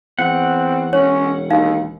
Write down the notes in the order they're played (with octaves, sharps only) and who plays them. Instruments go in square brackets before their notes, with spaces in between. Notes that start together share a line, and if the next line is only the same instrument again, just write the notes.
[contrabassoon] E2 [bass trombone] C4 [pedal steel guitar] F#5
[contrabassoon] E1 [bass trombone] C#4 [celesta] C#5
[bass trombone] D#2 [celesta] D#4 F5